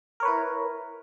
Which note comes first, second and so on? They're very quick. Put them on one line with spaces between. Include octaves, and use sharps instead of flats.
A#4 C#5 B4 E4